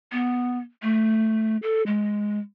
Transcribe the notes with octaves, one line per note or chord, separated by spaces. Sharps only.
B3
A3
A4
G#3